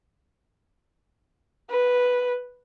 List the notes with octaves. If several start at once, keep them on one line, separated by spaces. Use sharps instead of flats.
B4